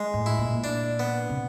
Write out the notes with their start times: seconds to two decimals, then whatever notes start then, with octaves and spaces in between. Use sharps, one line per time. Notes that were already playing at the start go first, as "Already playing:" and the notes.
Already playing: G#3
0.14 A2
0.26 E4
0.39 A#2
0.64 D4
0.99 B3
1.29 C3